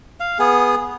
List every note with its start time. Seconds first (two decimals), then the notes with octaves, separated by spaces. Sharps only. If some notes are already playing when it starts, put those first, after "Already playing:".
0.20 F5
0.39 B3 G#4